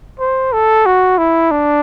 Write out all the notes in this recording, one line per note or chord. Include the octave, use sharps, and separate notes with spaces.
C5
A4
F#4
E4
D4